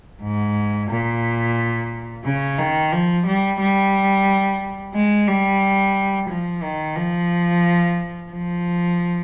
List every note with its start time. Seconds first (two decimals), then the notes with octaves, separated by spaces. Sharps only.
0.22 G#2
0.90 A#2
2.25 C#3
2.59 D#3
2.92 F3
3.26 G3
3.60 G3
4.94 G#3
5.28 G3
6.29 F3
6.63 D#3
6.96 F3
8.32 F3